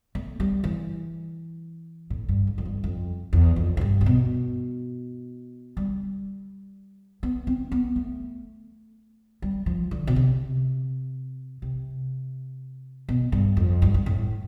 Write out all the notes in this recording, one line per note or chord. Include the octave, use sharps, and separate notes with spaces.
A3
G3
E3
A2
G2
F2
F2
G2
F2
E2
F2
F2
G2
C3
B2
G3
B3
C4
B3
A3
G3
F3
D3
B2
C3
C3
B2
G2
F2
G2
G2
A2